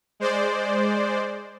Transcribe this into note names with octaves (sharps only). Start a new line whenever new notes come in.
G#3 C5 D5